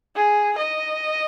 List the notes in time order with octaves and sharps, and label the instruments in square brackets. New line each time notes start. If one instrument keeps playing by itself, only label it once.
[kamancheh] G#4
D#5